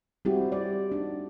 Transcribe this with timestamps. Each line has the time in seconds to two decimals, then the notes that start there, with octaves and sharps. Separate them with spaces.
0.25 G3 G#3 C4 E4 F#4 G4
0.52 D5
0.92 D4 D#4